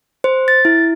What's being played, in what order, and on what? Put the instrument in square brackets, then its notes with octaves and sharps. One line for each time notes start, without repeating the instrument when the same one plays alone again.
[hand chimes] C5
A6
E4